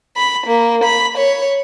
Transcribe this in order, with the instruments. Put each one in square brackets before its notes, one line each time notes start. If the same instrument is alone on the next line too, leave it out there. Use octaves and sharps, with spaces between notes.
[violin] B5
A#3
B5
C#5